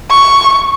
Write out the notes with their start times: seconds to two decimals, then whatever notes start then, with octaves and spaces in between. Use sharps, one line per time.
0.11 C#6